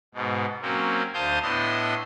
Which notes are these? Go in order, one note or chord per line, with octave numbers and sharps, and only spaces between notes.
G#2 B2
F#3 A#3 C4 C#4
D2 C5 F5 A5 D#6 G6
A2 B3 D4 E4 D#5 C6